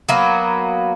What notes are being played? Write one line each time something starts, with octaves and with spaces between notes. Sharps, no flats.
F#3 A#3 B3